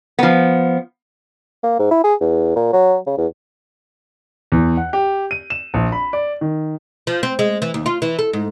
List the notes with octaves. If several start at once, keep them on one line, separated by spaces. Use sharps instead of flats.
F3 B3
A#3
G#2
E4
G#4
E2
A#2
F#3
C#3
E2
E2
F#5
G4
D#7
E7
A#1
B5
D5
D#3
F3
C4
G#3
E3
D#2
F4
E3
A4
G#2